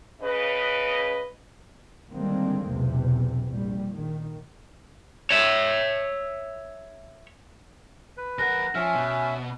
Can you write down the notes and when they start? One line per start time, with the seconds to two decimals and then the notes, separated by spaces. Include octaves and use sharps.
0.22 C#3 B4 D#5
2.12 D3 D#3 G3 G#3 A#3 C4
2.68 B1 E2 C3
3.47 A#1 G3
3.94 D#3
5.30 C#5 E5
8.17 B4
8.38 E2 A#4 F#5 F#6 A#6
8.75 F3 C#4 E5 G#5 F6
8.95 B2